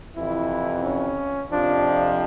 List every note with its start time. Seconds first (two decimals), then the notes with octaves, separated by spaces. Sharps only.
0.16 F2 C3 E3 E4
0.83 C#4
1.51 F2 C3 F3 D4